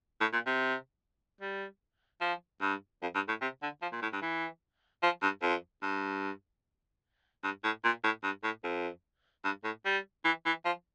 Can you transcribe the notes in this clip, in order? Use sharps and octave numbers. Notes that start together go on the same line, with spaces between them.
A2
A#2
C3
G3
F3
G2
F2
G2
A2
C3
D3
F3
A#2
A2
G2
E3
F3
G2
F2
G2
G2
A2
A#2
A2
G2
A2
F2
G2
A2
G3
E3
E3
F3